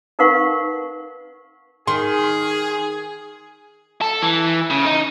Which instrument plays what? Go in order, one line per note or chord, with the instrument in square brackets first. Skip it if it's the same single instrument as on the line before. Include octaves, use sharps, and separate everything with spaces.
[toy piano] D#4 A#4 B4 F5 F#5 C#6
[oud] D#3 [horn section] G#4 [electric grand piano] C6
[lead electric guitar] A4
E3
C#3
D#4